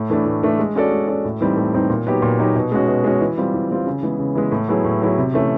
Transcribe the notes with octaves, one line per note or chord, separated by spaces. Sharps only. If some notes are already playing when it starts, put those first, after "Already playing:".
Already playing: A2
E3 A3 D4
A2
E3 A3 D4
G#3
C#4 F#4 A4 D5
G#3
C#4 F#4 A4 D5
A2
E3 G3 C4 D#4
A2
E3 G3 C4 D#4
A#2
F#3 B3 D#4 G4
A#2
F#3 B3 D#4 G4
B2
G#3 C#4 F#4
B2
G#3 C#4 F#4
E3
G3 C4 F4
E3
G3 C4 F4
C#3
E3 G#3 B3
C#3
E3 G#3 B3
A2
F#3 B3 E4 G#4
A2
F#3 B3 E4 G#4
C3
E3 A3 C#4